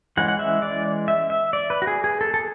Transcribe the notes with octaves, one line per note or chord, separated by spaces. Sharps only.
E3 G#3 C#4 F#5
F#5
E5
D5
E5
E5
D5
B4
F#4
G#4
G#4
A4
A4